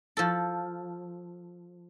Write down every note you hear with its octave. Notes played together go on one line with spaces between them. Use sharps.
F3 A4